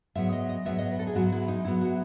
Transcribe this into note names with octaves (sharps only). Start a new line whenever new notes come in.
G#2 F#3 B3 E5
D#5
D#5
G#2 F#3 B3 E5
D#5
B4
A4
G#4
G#2 F#3 B3 F#4
E4
D#4
G#2 F#3 B3 E4
F#4